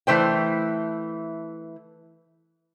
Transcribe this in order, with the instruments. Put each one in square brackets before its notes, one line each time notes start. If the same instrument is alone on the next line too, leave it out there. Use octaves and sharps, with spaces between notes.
[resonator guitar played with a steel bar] E3 A3 C5 G5